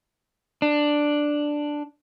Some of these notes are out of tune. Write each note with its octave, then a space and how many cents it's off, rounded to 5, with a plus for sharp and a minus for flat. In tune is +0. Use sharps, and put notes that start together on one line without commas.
D4 +5